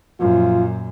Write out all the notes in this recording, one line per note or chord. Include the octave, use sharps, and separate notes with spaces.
F#2 A#2 F3 F4